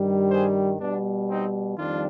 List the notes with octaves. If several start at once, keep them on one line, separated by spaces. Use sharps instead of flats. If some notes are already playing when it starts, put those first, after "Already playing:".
Already playing: G2 D#3 G3
G#4 C5
B2 G3 B3 D4
C4 D#4
F2 D#3 G3 D4 F4